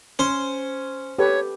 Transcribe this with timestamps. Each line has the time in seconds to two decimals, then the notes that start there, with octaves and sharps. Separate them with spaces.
0.19 C#4 C5
1.19 G4 A4 B4 C#5